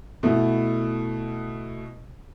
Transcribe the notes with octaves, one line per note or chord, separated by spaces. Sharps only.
B2 A3 B3 E4